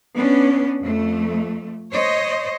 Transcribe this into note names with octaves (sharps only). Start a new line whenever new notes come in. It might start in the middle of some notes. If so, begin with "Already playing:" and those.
B3 C#4 D4
F2 A3
C5 C#5 D#5